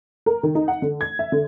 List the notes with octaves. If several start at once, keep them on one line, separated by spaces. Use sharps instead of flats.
A#4
D#3
D#4
F#5
D3
G#6
E5
D3